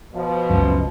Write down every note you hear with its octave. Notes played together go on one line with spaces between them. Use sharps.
B2 F3
F#1 C#2 F#2